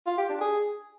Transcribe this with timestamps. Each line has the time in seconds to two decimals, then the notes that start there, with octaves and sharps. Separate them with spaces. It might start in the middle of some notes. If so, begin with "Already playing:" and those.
0.07 F4
0.18 G4
0.29 D4
0.41 G#4